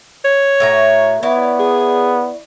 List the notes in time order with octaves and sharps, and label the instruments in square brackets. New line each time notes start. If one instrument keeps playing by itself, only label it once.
[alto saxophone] C#5
[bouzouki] A2 F#4 A#5
[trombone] B3 [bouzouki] E4 C#5 D5
[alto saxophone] G#4